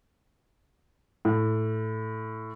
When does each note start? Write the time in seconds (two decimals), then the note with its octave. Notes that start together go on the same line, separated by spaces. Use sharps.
1.25 A2